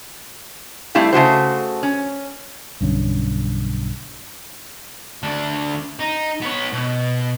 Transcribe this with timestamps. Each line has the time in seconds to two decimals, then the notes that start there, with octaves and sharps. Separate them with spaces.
0.95 G3 A3 C4 E4 F5
1.13 C#3 A3 F#4 C5
1.83 C#4
2.81 B1 G2 D3 C#4
5.23 D2 D4
5.99 D#4
6.41 B3 C#5
6.72 B2